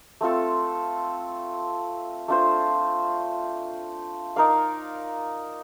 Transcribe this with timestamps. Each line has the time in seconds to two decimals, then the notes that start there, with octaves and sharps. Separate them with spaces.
0.21 A3 C4 F4 A4
2.28 A3 D4 F4 C5
4.36 D#4 A#4 D5 F5